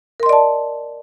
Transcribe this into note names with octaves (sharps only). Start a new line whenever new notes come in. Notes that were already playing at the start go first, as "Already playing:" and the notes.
A#4 D5 D#5 A5 C6